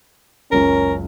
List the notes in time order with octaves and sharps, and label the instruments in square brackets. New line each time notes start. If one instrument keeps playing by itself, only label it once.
[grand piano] F#1 C#2 [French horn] C#4 [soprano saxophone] A#4